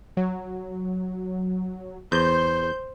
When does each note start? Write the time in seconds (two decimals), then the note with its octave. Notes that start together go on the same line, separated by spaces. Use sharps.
0.17 F#3
2.12 E2 C5 G6